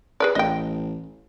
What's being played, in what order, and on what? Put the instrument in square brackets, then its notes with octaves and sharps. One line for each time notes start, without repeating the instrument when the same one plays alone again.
[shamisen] G#4 B4 D5
[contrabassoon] A1 [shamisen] D#5 G5